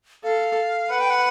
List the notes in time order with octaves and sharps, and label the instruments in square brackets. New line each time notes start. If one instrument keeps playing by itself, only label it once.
[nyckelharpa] A4 [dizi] F5
[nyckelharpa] B4 [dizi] F#5
[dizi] G5
F#5